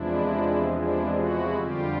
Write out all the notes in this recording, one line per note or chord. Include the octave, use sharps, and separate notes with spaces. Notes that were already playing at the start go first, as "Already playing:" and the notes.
Already playing: E2 C3 F3 G#3 D4 E4
D4 E4
E4 F#4
F2 D3 G3 F4 G4